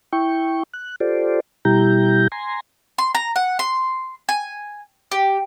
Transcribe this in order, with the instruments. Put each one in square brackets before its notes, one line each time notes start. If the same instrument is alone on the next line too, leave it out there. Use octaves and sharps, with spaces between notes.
[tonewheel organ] E4 G5 C#6
F#6
F4 G4 A4 C5 D5
B2 G3 E4 G4 A#5 G6
G#5 A#5 C6
[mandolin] C6
A#5
F#5
C6
G#5
G4